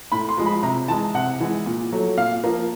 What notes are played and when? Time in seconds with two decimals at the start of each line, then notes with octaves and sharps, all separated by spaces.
0.12 A2 B5
0.29 C6
0.37 F3 G#3
0.46 B5
0.63 C3 A#5
0.88 E3 A5
0.91 G#3
1.14 C3 F#5
1.40 E3 G#3
1.66 A#2
1.92 F#3 A3
2.18 A#2 F5
2.43 F3 A#3